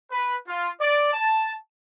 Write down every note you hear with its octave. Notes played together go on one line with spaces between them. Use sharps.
B4
F4
D5
A5